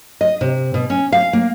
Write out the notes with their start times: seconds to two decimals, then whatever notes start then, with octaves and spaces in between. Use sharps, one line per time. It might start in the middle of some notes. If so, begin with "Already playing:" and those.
0.21 D#5
0.41 C3
0.74 B2
0.90 C#4
1.12 F5
1.33 A#3